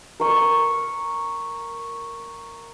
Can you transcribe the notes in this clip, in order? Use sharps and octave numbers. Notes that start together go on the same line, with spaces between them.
A#4 C#6